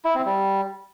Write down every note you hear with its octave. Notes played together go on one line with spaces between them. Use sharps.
E4
C4
G3